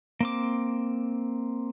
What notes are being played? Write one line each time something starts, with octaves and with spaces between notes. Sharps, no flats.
A#3 C4 D6